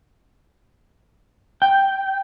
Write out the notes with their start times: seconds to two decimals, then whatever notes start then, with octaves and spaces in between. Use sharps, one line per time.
1.62 G5